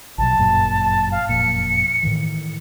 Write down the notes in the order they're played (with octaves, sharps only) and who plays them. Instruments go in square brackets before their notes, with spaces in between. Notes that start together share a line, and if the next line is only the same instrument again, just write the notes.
[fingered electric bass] A#1 B2 F#3 [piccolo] A5
[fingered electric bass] G1 F#2 A#2
[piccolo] F5
[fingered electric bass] F#1 F2 A#2 [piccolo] C#7
[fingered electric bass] A2 D#3 E3